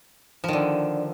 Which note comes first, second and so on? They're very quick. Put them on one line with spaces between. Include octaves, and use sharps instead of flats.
F3 D#3 D3